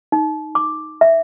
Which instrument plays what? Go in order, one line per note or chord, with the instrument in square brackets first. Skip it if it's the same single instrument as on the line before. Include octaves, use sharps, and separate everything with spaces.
[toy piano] D#4
D6
E5